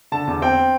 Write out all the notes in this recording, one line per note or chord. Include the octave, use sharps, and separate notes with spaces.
D3 A5
E2
C4 G5